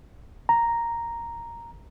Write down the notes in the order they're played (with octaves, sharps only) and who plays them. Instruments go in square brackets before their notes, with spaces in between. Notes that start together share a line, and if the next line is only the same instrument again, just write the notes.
[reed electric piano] A#5